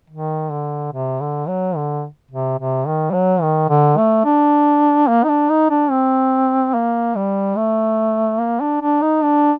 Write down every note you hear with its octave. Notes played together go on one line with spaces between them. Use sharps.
D#3
D3
C3
D3
F#3
D3
C3
C3
D#3
G3
F#3
D#3
D3
A3
D4
A#3
D#4
D4
D#4
D4
C4
A#3
G3
A3
A#3
D4
D4
D#4
D4